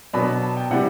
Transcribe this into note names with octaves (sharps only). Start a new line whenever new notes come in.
B2 F#3 B3 D4 B5
A5
G5
C3 E3 G3 F#5